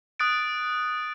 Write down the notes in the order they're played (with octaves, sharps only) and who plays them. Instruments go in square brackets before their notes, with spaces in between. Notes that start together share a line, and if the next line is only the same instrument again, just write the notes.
[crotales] D#6 F#6 A6 D7